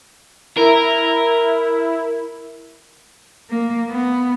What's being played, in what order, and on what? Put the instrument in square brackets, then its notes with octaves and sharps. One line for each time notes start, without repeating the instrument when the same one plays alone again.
[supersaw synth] E4 [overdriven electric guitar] A#4
[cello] A#3
B3